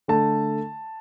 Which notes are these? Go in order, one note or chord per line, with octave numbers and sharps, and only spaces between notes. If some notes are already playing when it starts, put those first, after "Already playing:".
D3 A3 A5